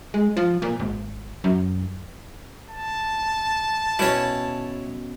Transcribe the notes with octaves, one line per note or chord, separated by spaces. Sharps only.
G#3
F3
A#2
G#1
F#2
A5
B2 C#4 E4 C#5